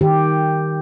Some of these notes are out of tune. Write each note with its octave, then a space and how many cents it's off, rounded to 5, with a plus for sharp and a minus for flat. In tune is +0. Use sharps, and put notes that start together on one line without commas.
D#3 +0 G4 +0